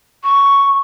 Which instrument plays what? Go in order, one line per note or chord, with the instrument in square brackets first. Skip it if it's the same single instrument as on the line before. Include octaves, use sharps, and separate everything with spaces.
[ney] C#6